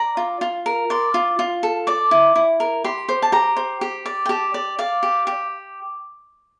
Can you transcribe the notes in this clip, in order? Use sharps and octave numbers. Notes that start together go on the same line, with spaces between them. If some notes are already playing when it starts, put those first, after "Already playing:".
Already playing: D5 A#5
F4
F4
A#4
D5 C6
F4
F4
A4
D5 D6
E4
E4
A#4
G4 C6
C5
A5
G4 A#5
C5
G4
D5
G5
G4 A5
D5
D5 F5
G4
G4